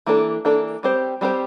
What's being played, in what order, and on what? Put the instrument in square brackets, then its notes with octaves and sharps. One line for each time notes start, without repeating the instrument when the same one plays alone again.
[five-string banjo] E3 A#3 D4 A4
E3 A#3 D4 A4
G3 C4 G4 C5
G3 C4 G4 C5